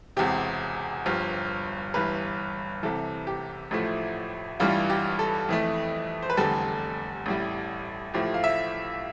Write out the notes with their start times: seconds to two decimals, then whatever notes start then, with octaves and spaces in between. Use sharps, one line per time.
0.17 E1 E2 C3 G4
1.06 G1 G2 F3
1.94 G1 G2 E3 B4
2.83 C2 C3 E3 A4
3.27 G4
3.71 A1 A2 F3 A3
4.60 A1 G2 E3 G3 F4
4.90 G4
5.19 A4
5.49 F2 E3 A3
6.23 C5
6.30 B4
6.37 F1 E2 D3 G3 A4
7.26 A1 A2 G3
8.14 A1 A2 F3 A3 G4
8.34 F5
8.44 E5